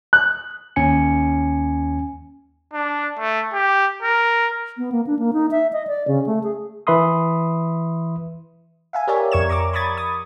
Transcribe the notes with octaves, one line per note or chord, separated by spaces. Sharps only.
F#6
D#2 C#4 G#5 C#7
D4
A3
G4
A#4
B3
A#3
D4
A#3
D#4
E5
D#5
D5
C#3
A3
G#4
E3 B4 E5 B5 C6 D#6
E5 F5 G#5
G4 A#4 C#5 D5 E5 G#5
F2 A#4 C#6 G#6 E7
A#5 C#6 D6
B5 C#6 D#6 G#6 A6
D#6